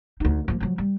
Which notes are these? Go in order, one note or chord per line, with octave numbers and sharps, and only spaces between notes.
D2 D#4
F3 A#3
F3 F#3
G3